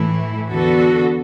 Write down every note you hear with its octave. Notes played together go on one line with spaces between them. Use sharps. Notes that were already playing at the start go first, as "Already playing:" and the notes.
Already playing: A2 E3 A3 E4
E2 D3 B3 F#4 A4